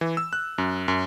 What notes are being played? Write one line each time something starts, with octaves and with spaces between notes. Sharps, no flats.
E3
E6
F#6
F#2
F#2